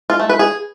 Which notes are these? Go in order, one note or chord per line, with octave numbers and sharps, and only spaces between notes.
F4
A3
B4
G#4